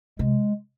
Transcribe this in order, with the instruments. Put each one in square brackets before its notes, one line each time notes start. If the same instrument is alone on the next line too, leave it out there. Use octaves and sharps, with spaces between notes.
[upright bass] C3 [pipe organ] G#3